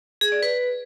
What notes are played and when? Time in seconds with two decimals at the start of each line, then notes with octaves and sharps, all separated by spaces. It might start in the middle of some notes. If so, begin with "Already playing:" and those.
0.21 G#4
0.32 D5
0.43 B4